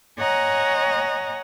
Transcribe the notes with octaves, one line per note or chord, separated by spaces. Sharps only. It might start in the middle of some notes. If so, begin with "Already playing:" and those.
C#5 D#5 F#5 G#5 A#5